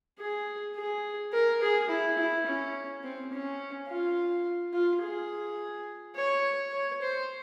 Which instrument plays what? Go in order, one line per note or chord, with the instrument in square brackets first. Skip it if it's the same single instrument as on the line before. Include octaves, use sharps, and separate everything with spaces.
[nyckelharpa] G#4
G#4
A#4
G#4
E4
E4
C#4
C4
C#4
F4
F4
G#4
C#5
C#5
C5